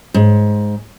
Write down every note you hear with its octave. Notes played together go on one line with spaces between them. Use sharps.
G#2